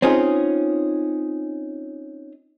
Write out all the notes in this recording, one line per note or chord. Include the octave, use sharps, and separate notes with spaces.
C4 C#4 D#4 F4 G#4